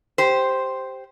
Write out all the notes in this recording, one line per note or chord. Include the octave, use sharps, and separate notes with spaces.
G4 C5